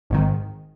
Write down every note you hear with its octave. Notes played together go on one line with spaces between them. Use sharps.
G#1 G#2 D#3